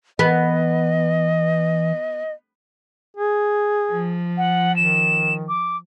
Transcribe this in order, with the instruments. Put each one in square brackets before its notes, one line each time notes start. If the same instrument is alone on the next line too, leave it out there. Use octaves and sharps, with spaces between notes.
[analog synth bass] E3 [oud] B3 [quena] D#5
[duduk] G#4
[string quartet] F3
[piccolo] F#5
[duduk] D#3 [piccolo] E7
[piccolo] D6